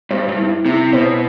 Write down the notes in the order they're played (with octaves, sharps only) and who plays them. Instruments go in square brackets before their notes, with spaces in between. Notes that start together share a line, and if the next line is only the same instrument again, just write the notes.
[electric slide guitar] G2 [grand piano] C5
[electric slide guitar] G2
[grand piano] E4
[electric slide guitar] C3 [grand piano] E4
[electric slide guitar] B2 [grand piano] C5